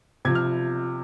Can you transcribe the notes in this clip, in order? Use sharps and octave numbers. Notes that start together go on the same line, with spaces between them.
C3 F3 G#6
F6